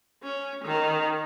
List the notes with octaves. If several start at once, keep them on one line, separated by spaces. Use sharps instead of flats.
C#4
D#3